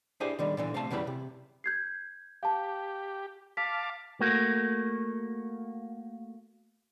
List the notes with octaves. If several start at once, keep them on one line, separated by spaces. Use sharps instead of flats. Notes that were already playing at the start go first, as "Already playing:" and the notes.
D4 E4 G4 G#4 C5 G#5
D3 D#3 G3
A#2 D3 E3
C3 A3 F5 A5
F#2 C#3 E3 G3 B5
C3
G6 G#6 C7
G4 F5 A5
F5 A5 D6 B6
A3 A#3 F#4